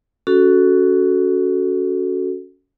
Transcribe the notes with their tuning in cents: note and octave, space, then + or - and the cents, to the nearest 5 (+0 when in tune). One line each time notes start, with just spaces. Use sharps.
C#4 +20 F#4 +5 A4 +0